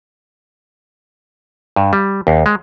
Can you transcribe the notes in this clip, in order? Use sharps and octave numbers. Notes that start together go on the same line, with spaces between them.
G2
G3
D#2
G#3